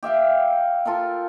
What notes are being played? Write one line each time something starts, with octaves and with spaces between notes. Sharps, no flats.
G4 E5 F5 G5
F4 A4 A#4 F5